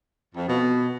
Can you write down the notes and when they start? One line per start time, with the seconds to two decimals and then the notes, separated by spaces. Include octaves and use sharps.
0.34 F2
0.46 B2